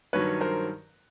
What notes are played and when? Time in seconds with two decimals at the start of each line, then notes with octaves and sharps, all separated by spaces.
0.13 G2 D#3 F#3 B4 C#5
0.41 A#4 C5